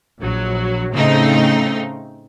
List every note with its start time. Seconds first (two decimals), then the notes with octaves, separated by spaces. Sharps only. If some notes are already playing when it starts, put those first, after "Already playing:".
0.18 A#1 F#3
0.92 A2 C#3 A3 C4 D#4